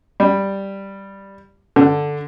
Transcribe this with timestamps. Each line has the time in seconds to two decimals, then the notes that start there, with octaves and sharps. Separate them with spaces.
0.20 G3
1.76 D3